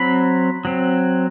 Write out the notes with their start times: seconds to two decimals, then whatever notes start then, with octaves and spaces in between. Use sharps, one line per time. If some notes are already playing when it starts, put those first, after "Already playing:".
Already playing: F#3 C4 B5
0.65 F#3 C4